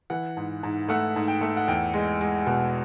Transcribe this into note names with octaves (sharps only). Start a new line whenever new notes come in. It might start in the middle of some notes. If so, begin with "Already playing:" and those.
E3 F#5
G#2
G#2
A3 F#5
G#2
G5
A3
F#5
E2 G5
G#3
G#3
B2